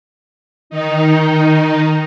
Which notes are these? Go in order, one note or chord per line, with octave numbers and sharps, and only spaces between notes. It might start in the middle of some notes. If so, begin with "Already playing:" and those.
D#3 D#4